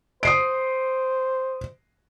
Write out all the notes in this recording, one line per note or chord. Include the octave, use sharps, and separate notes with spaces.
C5 D#6 C7 D7